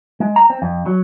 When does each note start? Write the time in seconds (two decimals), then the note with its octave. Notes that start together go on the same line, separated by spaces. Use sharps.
0.20 G#3
0.36 A#5
0.50 C4
0.62 F2
0.86 F#3